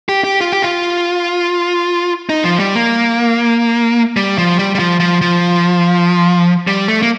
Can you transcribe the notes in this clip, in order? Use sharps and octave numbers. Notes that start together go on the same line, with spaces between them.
G4
G4
F4
G4
F4
D#4
F3
G3
A#3
G3
F3
G3
G3
F3
F3
F3
G3
A3
A#3